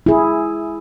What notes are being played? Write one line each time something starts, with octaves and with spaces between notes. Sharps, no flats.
E4 G#4